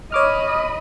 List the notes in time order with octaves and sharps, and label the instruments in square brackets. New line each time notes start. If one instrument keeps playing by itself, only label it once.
[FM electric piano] C#5 D6 F6 [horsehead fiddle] D#5 B5